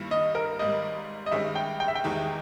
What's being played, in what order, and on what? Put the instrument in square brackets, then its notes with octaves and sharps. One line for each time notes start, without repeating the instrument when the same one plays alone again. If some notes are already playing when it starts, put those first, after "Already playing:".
Already playing: [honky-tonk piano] G2 D#3 G3 A#3 E4
[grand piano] D#5
A#4
[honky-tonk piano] G#1 G#2 G3 [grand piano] D#5
[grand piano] D#5
[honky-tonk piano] G2 D#3 G#3 C#4 G4 [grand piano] E5
[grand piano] G5
G5
E5
G5
[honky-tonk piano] E2 D#3 G#3 D#4 G4